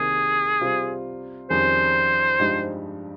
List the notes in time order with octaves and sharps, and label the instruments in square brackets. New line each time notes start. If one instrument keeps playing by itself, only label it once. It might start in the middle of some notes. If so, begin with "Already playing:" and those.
Already playing: [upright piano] C2 C3 D#3 A#3 [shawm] G#4
[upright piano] C3 G3 C4 F4
[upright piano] F2 D#3 G3 C#4 G#4 [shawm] C5
[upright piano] G2 F3 G#3 D#4 G4